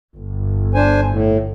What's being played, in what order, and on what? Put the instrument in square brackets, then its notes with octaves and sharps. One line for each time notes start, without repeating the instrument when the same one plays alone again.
[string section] G1
[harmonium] D4 C5 G#5
A2